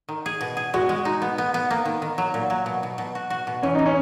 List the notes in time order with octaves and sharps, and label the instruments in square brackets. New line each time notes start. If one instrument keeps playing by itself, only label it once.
[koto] D#3
G#4
B2
G#4
[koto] G#3 [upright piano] F#4
[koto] G#3
D#4
B3
B3
B3
A#3
D#3
D#3
F#3
A#2
F#3
B2
B2
B2
F#4
F#4
B2
[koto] E3 [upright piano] C#4
[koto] E3 [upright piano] D#4
[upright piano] C#4